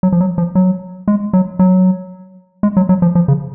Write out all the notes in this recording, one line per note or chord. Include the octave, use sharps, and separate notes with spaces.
F#3
F3
F#3
F3
F#3
G#3
F#3
F#3
G#3
F#3
F#3
F3
F3
C#3